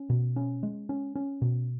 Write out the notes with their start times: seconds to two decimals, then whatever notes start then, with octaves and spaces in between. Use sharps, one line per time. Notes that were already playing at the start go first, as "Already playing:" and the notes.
Already playing: C#4
0.10 B2
0.36 C#4
0.63 G#3
0.89 C#4
1.15 C#4
1.42 B2